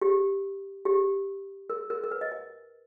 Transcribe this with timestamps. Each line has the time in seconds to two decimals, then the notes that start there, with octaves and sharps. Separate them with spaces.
0.01 G4
0.85 G4
1.70 A#4
1.90 A#4
2.04 A#4
2.11 B4
2.21 D#5
2.31 D#5